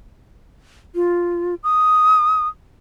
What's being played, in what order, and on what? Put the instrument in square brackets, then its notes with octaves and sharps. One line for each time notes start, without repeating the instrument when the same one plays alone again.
[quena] F4
D#6